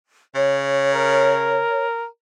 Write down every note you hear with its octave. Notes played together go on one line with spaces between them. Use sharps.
C#3 C#5
A#4